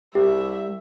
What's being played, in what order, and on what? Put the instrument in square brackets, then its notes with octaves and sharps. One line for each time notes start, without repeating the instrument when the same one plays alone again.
[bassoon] C2 [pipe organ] G3 [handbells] G4 [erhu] E5